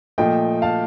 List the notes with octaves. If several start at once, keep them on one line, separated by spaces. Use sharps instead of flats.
A#2 F3 A3 D#5 G5
F5 A5